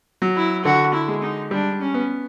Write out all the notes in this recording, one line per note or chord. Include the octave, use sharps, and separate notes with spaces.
F#3
E4
D3 F#4
E4
G#3
D#4
G3 D4
C#4
B3